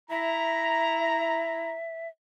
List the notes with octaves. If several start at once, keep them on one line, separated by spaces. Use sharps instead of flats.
E4 E5 A#5